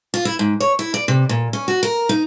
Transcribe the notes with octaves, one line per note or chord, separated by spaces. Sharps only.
F4
E4
G#2
C#5
E4
D5
C3
A#2
C#4
F#4
A#4
D#4